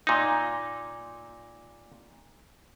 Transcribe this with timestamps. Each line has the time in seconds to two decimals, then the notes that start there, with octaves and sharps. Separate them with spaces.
0.07 A#2 D#4